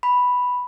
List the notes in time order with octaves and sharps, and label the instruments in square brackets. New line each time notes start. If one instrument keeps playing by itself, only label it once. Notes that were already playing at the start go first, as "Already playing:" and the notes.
[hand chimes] B5